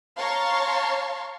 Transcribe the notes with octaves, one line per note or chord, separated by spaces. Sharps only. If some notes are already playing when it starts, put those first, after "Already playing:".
C#5 F5 A5 A#5 C6 C#6